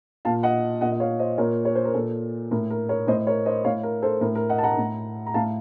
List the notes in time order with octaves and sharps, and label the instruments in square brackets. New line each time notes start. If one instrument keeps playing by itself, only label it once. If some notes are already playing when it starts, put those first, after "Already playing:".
[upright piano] A#2 F5 A5
D#5 F#5
A#2 D#5 F#5
D#5
C#5 F5
C5 D#5
A#2 A#4 C#5
C#5
C5
A#4
A#2 A4
A2 A#4
A#4
A#4 C#5
A2 C5 D#5
A#4 C#5
C5 D#5
A2 C#5 F5
A#4
A4 C5
A2 A#4
A#4
D#5 F#5
A5
F#5 A#5
A2
A#5
A2 F5 A5